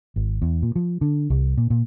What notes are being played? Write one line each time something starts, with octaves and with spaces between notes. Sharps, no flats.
G#1
E2
A#2
F3
D3
C2
A#2
A#2